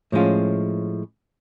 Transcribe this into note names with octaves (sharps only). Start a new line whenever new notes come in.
A2 F3 G#3 C#4 F4